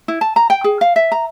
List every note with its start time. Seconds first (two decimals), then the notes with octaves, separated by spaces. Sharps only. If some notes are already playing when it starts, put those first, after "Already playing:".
0.08 E4
0.21 A5
0.36 A#5
0.50 G5
0.64 G#4
0.81 F5
0.96 E5
1.12 A#5